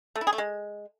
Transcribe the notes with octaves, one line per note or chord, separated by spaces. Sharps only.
A3
E4
G#4
A3
G#3